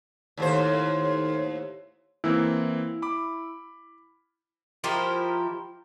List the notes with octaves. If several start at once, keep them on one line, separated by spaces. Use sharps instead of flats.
D#2 A2 C5
E3 A#3 C4 E4
B5 D6
F3 E4 G4 A#4